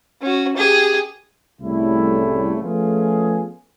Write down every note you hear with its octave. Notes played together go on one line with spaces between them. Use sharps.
C#4 F#4
G4 G#4
C2 A2 C#3 G3 A3 E4
F3 A3 B3 C#4 F4 G#4